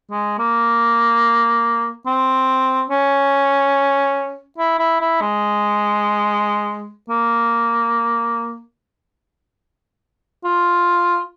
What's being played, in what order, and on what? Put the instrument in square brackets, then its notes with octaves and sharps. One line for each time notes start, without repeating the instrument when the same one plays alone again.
[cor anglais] G#3
A#3
C4
C#4
E4
E4
E4
G#3
A#3
F4